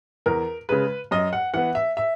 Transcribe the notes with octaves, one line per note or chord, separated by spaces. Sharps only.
E2 A#4
C#3 G#3 B4
F#2 D#5
F#5
E3 B3 F#5
E5
E5